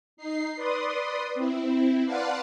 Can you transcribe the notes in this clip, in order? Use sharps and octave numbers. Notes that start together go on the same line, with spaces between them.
D#4 C7
B4 D5 C6 D#6
C4 E4
B4 D5 F5 F#5 A5 C6